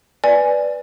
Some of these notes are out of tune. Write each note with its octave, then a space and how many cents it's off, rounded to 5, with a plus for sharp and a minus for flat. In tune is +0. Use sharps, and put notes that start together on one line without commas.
B4 +0 D5 +0 G#5 +0